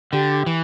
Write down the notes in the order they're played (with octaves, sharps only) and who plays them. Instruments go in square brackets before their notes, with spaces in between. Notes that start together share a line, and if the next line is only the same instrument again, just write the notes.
[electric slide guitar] D3 [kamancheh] G4
[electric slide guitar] E3